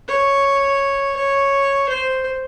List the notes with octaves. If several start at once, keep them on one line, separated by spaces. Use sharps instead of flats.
C#5
C#5
C5